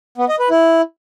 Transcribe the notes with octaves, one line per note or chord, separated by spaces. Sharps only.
B3
D#5
B4
E4